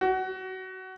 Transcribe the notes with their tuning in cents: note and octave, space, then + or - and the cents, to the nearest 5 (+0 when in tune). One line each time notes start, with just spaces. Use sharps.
F#4 +20